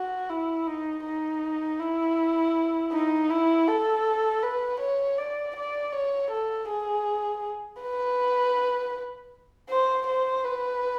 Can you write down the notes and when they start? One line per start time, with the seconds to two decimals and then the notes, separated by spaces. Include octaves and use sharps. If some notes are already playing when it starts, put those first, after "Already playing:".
Already playing: F#4
0.29 E4
0.67 D#4
1.04 D#4
1.79 E4
2.92 D#4
3.30 E4
3.67 A4
4.43 B4
4.80 C#5
5.18 D5
5.56 D5
5.93 C#5
6.31 A4
6.69 G#4
7.81 B4
9.69 C5
10.07 C5
10.44 B4